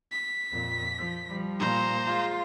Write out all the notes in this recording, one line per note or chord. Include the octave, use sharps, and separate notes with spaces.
B6
F2 A#2
F3
F3 G3
A#2 C5 A#5
G#3 F4